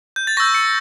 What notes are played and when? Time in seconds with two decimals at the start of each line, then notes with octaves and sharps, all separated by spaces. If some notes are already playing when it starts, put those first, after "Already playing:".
0.16 G6
0.27 A6
0.37 C#6 E6 G6 A#6
0.55 C#7